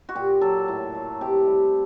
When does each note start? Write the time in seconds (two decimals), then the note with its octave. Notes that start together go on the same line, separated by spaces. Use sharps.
0.09 F#4
0.15 A#2 G4
0.41 F#3 A4
0.68 A2
0.95 A3
1.21 C3 G4
1.46 G3